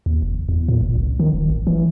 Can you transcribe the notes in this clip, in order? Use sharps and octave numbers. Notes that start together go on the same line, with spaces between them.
D#2
F1
E2
A#2
G1
C#2
D#3
D#1
A1
E3